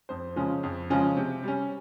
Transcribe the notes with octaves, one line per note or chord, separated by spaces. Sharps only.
F2 C5
C#3 F3 G#3 C#4
F2
C#3 F3 G#3 C#4
C3
G3 C#4